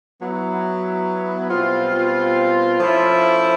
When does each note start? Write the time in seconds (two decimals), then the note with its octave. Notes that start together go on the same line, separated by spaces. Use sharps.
0.20 F#3 B3 E4
1.49 B2 G3 C4 F4
2.78 F3 A3 C#4 E4